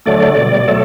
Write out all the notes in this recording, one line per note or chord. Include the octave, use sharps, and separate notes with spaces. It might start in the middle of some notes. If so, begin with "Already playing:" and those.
D3 F#3 A3 D5
B2 G3
B2 F#3 A3 A4